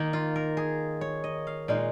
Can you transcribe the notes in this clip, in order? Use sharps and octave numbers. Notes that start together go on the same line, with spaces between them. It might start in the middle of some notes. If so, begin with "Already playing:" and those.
Already playing: D#3 A#3 D#4
F4
A#4
G#4
C#5
D#5
F5
A#2 G#3 D#4 F5